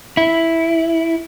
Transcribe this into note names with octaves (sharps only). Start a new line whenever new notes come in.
E4